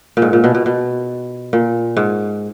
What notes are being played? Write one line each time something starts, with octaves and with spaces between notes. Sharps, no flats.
A#2
G#2
A#2
B2
B2
B2
A#2
G#2